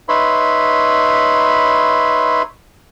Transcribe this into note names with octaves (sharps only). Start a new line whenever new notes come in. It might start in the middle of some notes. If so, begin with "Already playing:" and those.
D#4 B4 C#5 E5 B5 C6